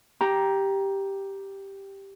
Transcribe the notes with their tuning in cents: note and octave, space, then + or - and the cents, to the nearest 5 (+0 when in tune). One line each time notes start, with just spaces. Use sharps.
G4 +0 A#5 +15